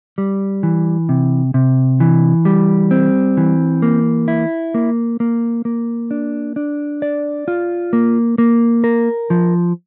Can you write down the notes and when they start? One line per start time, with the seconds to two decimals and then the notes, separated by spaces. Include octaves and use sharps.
0.18 G3
0.63 E3
1.09 C3
1.54 C3
2.00 E3
2.45 G3
2.91 C4
3.37 E3
3.82 A#3
4.28 E4
4.74 A#3
5.20 A#3
5.65 A#3
6.11 D4
6.56 D4
7.02 D5
7.48 F4
7.93 A#3
8.38 A#3
8.84 A#4
9.30 F3